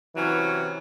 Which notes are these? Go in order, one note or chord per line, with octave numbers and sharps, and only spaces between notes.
C3 E3 F#3 C#4